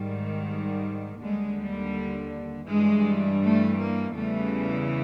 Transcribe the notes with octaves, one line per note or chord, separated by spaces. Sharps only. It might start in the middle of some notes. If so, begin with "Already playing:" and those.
Already playing: G#2 D#3 G3
G3
D#2 D3 G3 G#3
G3
G2 E3 G3 G#3
A3
A#3
E2 C#3 E3 G3 A3